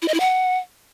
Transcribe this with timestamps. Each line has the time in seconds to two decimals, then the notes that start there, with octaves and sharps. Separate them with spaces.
0.02 E4
0.08 D#5
0.14 E4
0.20 F#5